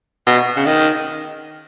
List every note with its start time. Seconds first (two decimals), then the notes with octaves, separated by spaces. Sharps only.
0.27 B2
0.56 C#3
0.66 D#3